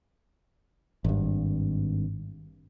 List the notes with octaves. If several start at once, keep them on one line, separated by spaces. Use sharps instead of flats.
G#1 G2